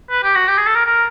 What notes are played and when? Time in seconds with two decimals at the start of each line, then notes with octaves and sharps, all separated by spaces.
0.11 B4
0.23 G4
0.35 F#4
0.48 G4
0.58 G#4
0.67 A4
0.75 A#4
0.86 A#4